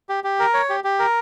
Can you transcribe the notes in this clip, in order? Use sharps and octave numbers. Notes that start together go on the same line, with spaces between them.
G4
G4
A#4
C#5
G4
G4
A#4